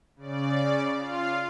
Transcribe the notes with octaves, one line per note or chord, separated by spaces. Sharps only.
C#3 D5
F4 F5